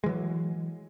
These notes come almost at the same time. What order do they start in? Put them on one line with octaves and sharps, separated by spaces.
G#3 E3 F#3